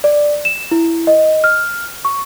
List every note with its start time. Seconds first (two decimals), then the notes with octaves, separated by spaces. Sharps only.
0.04 D5
0.45 E7
0.71 E4
1.07 D#5
1.44 F6
2.05 C#6